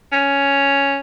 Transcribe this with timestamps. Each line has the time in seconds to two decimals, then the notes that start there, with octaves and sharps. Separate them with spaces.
0.13 C#4